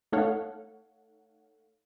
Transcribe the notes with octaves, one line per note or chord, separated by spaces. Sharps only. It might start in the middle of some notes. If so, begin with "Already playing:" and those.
A3 D#4 A4 C#5 F5 F#5